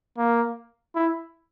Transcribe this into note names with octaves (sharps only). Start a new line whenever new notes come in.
A#3
E4